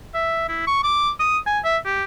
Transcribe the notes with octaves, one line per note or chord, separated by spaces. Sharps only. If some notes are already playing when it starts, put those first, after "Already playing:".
E5
E4
C#6
D6
D#6
G#5
E5
G4